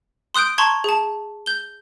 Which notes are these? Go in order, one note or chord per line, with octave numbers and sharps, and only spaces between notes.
C6 D#6 F#6 G6 D7
A5 A#5 C6 C#6 G#6
G#4 A5
G6 G7